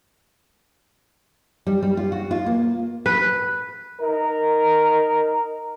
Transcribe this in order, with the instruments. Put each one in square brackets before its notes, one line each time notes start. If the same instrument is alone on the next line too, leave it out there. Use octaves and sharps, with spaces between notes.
[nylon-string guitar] G3
G3
F4
F#4
F4
A#3
[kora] B4
[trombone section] D#4 A#4